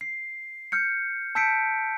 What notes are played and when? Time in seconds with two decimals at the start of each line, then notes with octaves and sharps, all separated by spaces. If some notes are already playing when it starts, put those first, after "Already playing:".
0.01 C7
0.72 F6 G6 C#7
1.35 A5 E6 G6 B6 C#7 D7